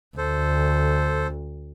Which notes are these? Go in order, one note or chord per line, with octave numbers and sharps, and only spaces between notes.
D2 A4 C5